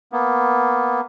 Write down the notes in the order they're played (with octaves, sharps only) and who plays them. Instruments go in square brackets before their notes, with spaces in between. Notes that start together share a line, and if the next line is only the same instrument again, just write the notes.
[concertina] A#3 B3